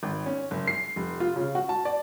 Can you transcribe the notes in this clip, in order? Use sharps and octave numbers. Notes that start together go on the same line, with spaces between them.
G#1
C#4
F#1
C7
F1
F4
C#3
F#4
A5
D5